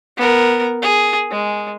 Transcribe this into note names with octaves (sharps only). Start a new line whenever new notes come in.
B3 A#4
G#4
G#3